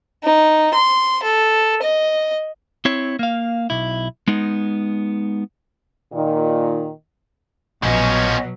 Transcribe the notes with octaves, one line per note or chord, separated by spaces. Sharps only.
D#4
C6
A4
D#5
C4 E4 C#5
A#3 F5
B1 E4
G#3 B3 D#4
A#2 D#3
A#1 B2 F3 F#3 C#4 D#5